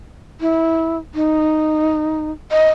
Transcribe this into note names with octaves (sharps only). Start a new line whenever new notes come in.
E4
D#4
D#5